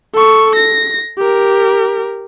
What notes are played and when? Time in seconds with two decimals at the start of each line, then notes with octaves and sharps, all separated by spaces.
0.14 A4 C#6
0.56 A#6
1.18 G4 A#4